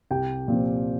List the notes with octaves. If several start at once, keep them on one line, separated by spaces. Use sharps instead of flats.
C2 G4 G5
A#2 F3 C4